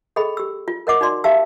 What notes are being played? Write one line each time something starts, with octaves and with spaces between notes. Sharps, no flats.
G#4 A4 D#5 G5 B5
G4 E6
F4
A#4 C#5 D#5 F#5 D6
D#4 F#4 D5 C6
G4 E5 F5 A5 E6